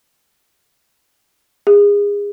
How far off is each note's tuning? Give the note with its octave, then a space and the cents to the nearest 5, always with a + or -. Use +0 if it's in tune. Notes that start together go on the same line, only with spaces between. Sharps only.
G#4 -30